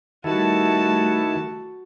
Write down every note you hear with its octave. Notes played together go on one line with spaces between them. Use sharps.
D#3 G3 A3 E4 F#4 A4 A5